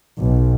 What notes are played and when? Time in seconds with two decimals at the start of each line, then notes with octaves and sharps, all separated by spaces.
0.23 B1